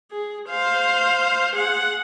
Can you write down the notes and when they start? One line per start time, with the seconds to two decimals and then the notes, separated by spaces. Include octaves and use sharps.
0.11 G#4
0.50 C5 F5
1.55 G#4 F#5